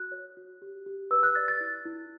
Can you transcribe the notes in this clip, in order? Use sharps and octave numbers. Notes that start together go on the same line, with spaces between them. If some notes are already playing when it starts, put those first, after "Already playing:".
Already playing: F#4 F#6
C#5
F#4
G4
G4
B4 E6
F#6
D5 A6
A6
E4
E4